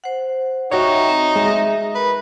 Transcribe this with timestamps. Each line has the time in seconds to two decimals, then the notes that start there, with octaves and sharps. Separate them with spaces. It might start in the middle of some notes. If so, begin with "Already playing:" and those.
0.04 C5 F#5
0.72 D#4 F#4 C#5 E5 G5 C#6
1.09 C4
1.36 G#3 E5
1.95 A#4 B4